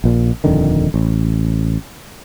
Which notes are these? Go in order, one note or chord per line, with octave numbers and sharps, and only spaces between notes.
A#1 A#2
D#1 F2 D3 D#3
A1